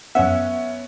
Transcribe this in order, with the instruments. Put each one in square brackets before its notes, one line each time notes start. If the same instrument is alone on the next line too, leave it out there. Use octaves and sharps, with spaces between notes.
[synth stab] F#2 F#5 [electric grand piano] B3 C#4 [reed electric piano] E5